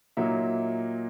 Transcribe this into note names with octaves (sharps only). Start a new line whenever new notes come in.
A#2 F#3 A#3 D#4 E5